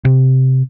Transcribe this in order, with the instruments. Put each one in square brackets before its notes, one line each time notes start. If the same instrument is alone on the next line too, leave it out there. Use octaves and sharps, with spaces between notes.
[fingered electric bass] C3